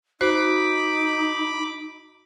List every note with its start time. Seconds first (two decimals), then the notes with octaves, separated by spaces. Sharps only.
0.21 D#4 F#4 C5 B5 D6